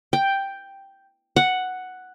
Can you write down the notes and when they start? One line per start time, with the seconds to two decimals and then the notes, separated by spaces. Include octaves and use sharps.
0.13 G5
1.36 F#5